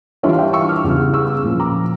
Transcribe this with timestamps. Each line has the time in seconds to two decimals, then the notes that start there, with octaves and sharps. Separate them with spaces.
0.23 E3 G3 D4 F4 C#5 E5
0.33 F5
0.38 E5 G5
0.53 C#6 E6
0.69 D6 F6
0.84 E2 C#3 G3
1.14 C#6 E6
1.44 A#2 F3 C#4
1.60 A#5 D6